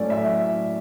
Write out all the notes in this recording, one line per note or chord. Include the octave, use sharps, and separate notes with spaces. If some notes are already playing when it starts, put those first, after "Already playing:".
Already playing: A2 F#3 A3 C#4 D5
E5